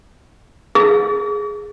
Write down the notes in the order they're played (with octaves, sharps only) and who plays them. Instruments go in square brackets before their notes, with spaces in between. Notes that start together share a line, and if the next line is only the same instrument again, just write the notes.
[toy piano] G#4